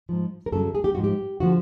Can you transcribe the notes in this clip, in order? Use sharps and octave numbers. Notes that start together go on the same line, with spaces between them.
G#2 F3
A#4
F#2 C#3 F#3 A4
G#4
G4
G#2 F3 F#4
G4
D3 F3 F#4